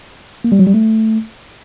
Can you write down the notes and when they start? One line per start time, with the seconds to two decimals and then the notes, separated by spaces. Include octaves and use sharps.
0.44 A#3
0.52 G3
0.59 F#3
0.67 G3
0.74 A3